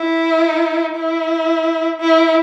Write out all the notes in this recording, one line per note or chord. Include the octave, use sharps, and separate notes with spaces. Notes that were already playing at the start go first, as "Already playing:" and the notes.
Already playing: E4
E4
E4